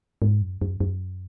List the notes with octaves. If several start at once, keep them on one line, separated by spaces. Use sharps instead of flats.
G#2
F#2
F#2
F#2